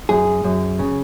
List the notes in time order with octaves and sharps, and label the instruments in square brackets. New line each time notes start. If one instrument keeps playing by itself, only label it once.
[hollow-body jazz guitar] F#2 G#4
F#2
C#3